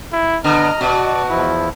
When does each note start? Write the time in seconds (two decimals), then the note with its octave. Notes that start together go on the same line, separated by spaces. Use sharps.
0.13 E4
0.44 D3 B3 D#5 A#5 F6
0.81 B2 F#4 D5
1.29 E2 F3 E4